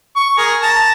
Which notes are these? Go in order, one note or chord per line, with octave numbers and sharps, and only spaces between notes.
C#6
G#4 A#4
A5 A#5